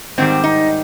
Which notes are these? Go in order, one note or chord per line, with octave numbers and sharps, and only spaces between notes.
G#2 D#3 G3 C4
D#4